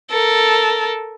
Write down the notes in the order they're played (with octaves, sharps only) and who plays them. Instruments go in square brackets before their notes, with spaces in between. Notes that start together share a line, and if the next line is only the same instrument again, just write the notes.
[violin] A4 A#4